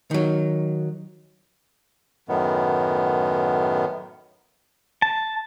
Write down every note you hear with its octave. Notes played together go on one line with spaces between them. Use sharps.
D#3 F#3
F#2 A2 D#3 B3
A5